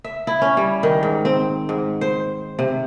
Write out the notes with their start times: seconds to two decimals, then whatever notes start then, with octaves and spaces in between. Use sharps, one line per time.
0.04 E5
0.27 E4
0.42 C#4
0.57 G3
0.83 D#3
1.03 G#2
1.25 C4
1.69 G#2
2.01 C5
2.59 C3